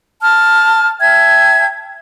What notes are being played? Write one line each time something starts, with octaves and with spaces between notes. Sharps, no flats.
A5 F6
E5 G5 A5 G#6